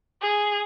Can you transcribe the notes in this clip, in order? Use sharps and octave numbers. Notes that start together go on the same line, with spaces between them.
G#4